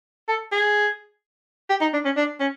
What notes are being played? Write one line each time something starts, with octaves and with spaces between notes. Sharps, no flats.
A4
G#4
G4
D#4
D4
C#4
D4
C#4